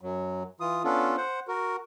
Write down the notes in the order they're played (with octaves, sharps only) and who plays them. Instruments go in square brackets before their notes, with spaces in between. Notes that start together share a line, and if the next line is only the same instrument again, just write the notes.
[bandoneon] F#2 F#3
E3 F4 D#6
B3 C#4 D4 F4 A4
C5 F#5
F#4 A#4